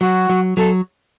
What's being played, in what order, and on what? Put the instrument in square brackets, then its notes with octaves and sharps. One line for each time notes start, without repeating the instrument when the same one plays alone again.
[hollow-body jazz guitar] F#3 [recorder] F#4
[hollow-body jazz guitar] F#3
[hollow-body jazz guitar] F#3 [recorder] A4